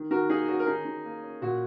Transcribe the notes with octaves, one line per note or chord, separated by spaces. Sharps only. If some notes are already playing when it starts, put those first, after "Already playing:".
Already playing: D#3
D#3 F#4 A#4
A#3 D#4 G#4
C#4 F#4
A#4
D#3 D#4 G#4
D#3
A#3
C#4
A#2 F#4